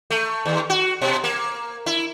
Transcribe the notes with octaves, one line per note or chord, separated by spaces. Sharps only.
A3
D#2
F#4
B2
A#3
E4